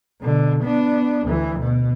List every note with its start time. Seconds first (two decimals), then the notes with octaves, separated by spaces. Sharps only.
0.21 B2 D3
0.63 B3 D4
1.27 D2 E3
1.59 B2